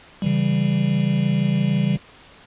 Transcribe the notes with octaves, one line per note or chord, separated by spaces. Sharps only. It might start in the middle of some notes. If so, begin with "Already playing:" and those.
C#3 E3 G3